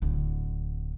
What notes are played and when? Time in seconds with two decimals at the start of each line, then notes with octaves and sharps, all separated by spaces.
0.02 D1 D3